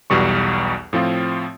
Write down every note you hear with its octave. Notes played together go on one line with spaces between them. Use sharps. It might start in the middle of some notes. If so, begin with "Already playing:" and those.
B1 E2 B2 G3 C#6
A2 F3 C4 F4